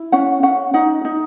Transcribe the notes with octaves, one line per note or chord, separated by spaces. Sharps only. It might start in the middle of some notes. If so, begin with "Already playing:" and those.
Already playing: E4
C#4 F#5
C#4 F#5
D#4 F#5
D#4